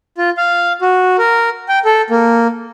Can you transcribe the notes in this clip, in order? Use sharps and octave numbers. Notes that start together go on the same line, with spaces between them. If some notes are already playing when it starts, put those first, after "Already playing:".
F4
F5
F#4
A#4
G5
A4
A#3